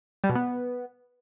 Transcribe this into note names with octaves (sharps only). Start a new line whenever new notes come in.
G3
B2
B3